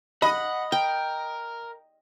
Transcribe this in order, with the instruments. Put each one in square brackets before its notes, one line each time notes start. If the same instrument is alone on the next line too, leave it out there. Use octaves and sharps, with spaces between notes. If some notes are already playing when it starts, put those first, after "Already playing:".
[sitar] D#5 [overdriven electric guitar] F#5 [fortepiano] B5
[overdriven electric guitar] A#4 [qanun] G5